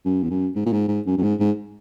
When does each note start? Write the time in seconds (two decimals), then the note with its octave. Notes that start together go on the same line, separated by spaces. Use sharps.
0.05 F#2
0.23 E2
0.30 F#2
0.56 G#2
0.66 A#2
0.73 G#2
0.88 G#2
1.06 F#2
1.18 F#2
1.23 G#2
1.40 G#2